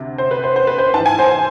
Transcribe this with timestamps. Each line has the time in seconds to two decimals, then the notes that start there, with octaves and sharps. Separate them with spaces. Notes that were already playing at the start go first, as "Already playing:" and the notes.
Already playing: D2 C3
0.18 C5
0.31 B4
0.44 C5
0.56 C5
0.67 B4
0.78 C5
0.94 G#2 E3 A5
1.06 G#5
1.19 C5